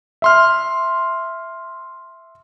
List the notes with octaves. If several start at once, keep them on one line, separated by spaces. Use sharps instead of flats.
E5 C6 F6